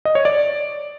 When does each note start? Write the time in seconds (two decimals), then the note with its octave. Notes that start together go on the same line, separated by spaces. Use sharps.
0.05 D#5
0.15 C#5
0.25 D5